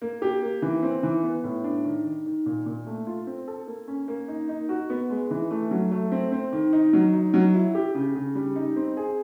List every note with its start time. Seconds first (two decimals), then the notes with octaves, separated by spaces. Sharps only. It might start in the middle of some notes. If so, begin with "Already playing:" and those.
0.02 A#3
0.22 G4
0.42 A#3
0.62 E3
0.83 C4
1.03 E3
1.23 B3
1.44 A2
1.64 D4
1.85 D#3
2.04 D#3
2.26 D#3
2.46 A#2
2.66 A#2
2.87 A3
3.07 F4
3.27 C4
3.48 A4
3.67 A#3
3.88 C#4
4.08 A#3
4.28 D#4
4.49 D#4
4.69 F#4
4.90 B3
5.10 G#3
5.31 E3
5.50 A3
5.71 F#3
5.92 A3
6.12 C4
6.32 C4
6.52 D#3
6.73 D#4
6.93 F#3
7.13 D#4
7.34 F#3
7.54 E4
7.75 G4
7.95 C#3
8.15 C#3
8.35 G3
8.56 D#4
8.76 C4
8.97 G#4